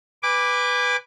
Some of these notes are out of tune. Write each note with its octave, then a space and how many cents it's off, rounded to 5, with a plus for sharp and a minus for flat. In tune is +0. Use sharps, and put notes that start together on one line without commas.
B4 +0 G#5 -35 D6 +0